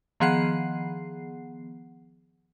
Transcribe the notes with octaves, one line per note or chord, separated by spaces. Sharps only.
D#3 F3 B3 G#4 F#5 C7